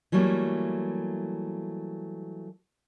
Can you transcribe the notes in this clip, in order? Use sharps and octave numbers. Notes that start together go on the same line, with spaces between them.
E3 F#3 G3 A3 A#3